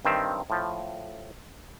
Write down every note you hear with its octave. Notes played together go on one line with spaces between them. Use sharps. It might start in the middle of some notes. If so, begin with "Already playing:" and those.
G2 D#3 C4 E5
A2 F3